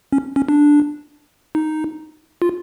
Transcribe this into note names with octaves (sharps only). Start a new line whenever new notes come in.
C#4
C#4
D4
D#4
F4